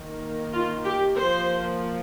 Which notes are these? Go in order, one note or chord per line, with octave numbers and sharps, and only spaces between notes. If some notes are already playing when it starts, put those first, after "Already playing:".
Already playing: D#3 A#3
F4
G4
F3 A#3 C5